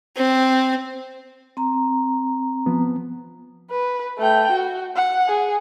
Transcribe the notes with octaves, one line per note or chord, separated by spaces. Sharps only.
C4
C4 A#5
F3 B3
B4
A3 G5
F#4
F#5
G#4